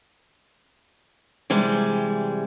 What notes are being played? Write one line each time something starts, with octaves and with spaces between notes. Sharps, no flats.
C3 E3 G3 G#3